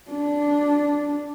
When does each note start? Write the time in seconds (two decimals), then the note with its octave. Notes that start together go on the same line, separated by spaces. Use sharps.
0.11 D4